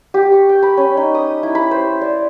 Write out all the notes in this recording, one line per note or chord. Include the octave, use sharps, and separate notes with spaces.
G4
C#6
G5
B5
C#4
D#4
D#6
E4
B5
C5
D5